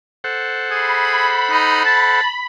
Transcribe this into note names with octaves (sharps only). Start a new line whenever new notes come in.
A4 C5 F#5
G#4 B5
D#4
A5